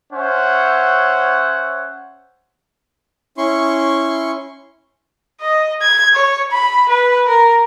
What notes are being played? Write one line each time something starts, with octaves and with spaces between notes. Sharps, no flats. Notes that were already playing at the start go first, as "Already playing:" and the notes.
C#4 C5 C#5 E5 F#5
C#4 E4 C6 C#6
D#5
G#6
C#5
B5
B4
A#4